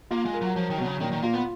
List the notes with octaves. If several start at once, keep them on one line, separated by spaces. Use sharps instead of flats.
A#3 F4
G#3
A#4
F#3
F3 F#3
D#3
B2 F#3
C#3
A#2 D#3
D#3
A#3 F4
B3